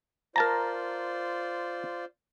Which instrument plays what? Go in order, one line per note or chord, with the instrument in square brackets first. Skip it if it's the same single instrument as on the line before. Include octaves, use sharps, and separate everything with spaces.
[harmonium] F4 C5 D5 [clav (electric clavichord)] A#4 A5 A#5